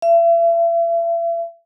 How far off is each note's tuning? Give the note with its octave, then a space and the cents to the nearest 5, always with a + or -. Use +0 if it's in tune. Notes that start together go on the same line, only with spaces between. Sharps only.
E5 +40